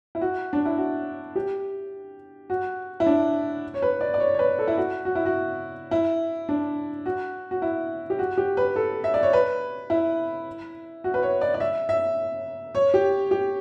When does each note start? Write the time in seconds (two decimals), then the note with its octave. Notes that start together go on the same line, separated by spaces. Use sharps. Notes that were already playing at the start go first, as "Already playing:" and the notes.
0.15 E4
0.21 F#4
0.53 D4
0.65 E4
0.78 F#4
1.36 G4
2.50 F#4
3.00 E4
3.06 D4
3.74 C#5
3.82 B4
4.01 D5
4.14 D5
4.20 C#5
4.34 C#5
4.39 B4
4.59 A4
4.68 E4
4.77 F#4
5.05 F#4
5.15 E4
5.26 F#4
5.91 E4
6.49 D4
7.06 F#4
7.51 F#4
7.62 E4
8.10 G4
8.19 F#4
8.38 G4
8.57 B4
8.76 A4
9.04 E5
9.14 D5
9.23 C#5
9.33 B4
9.90 E4
11.04 F#4
11.14 B4
11.22 C#5
11.41 D5
11.54 D5
11.60 E5
11.89 E5
12.75 C#5
12.94 G4
13.31 G4